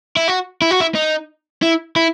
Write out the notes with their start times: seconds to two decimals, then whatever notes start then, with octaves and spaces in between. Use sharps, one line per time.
0.16 E4
0.28 F#4
0.62 E4
0.71 F#4
0.80 E4
0.95 D#4
1.62 E4
1.96 E4